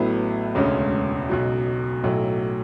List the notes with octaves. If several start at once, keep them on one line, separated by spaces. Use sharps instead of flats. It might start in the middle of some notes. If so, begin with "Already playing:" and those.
Already playing: A1 A2 F#3 B3 E4
E1 D2 C#3 G#3 C#4
B1 B2 F#3
B1 A2 F#3